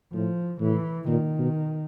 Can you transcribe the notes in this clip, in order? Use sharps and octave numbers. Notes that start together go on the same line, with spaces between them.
A2 F3
A2 E3
A#2 D#3
B2